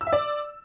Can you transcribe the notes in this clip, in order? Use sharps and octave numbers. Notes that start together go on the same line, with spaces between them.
E6
E5
D5